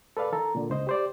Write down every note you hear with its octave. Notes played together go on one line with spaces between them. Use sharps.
A4 B4 D5 F5
D#3 A4 A#5
A#2 D3
C#2 C5 D#5
G4 C5 D5